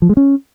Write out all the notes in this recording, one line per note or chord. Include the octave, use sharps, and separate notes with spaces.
F3
G#3
C#4